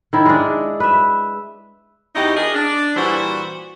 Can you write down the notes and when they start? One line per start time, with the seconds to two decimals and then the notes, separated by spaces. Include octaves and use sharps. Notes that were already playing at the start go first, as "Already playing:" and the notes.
0.13 D#3 E4
0.26 G#3 D4
0.80 B4 E5
2.16 E2 D#4 E4 F#4 G4 D#5
2.36 D4 G#4 A#4 D#5
2.55 D4
2.97 A#2 E3 G3 F#4 C5